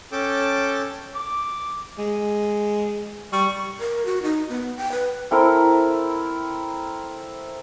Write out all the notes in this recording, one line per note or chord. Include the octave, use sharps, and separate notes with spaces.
C#4 A4 G5 A5 D6
D6
G#3
G3 C#6
A#4
F#4
D#4
B3
G5
B4
C4 E4 A4 A#4